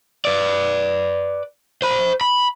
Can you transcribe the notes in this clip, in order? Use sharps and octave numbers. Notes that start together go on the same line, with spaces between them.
B4 D5
C5 B5
B5